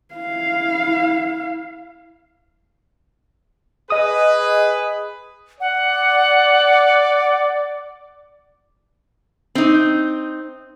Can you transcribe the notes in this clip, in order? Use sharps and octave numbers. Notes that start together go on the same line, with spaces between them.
E4 F5
G#4 B4 D#5 D#6
D5 F#5
C4 D#4